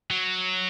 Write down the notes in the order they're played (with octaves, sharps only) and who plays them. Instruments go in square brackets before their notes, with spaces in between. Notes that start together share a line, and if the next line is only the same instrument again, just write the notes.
[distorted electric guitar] F#3